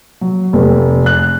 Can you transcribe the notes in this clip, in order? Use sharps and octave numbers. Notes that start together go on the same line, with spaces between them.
F#3
F1
F#6